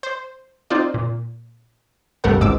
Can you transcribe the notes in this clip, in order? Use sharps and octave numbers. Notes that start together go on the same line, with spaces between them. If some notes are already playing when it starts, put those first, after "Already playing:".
C5
C4 D#4 F4 D5
A#2
C2 G2 A3 A#4 F#5
G#1 C#2 G#2 D6 E6